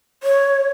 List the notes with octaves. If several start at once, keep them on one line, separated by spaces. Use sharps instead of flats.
C#5